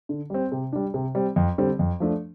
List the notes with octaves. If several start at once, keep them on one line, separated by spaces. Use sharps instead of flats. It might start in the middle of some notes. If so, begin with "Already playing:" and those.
D3
G3 C4
C3
G3 D4
C3
G3 C4
F2
D3 G3 C4
F2
F3 A3 D4